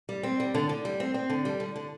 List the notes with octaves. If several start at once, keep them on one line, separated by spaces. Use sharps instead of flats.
G3
C4
G3
D3
D3
G3
C4
C4
D3
G3
D3
D3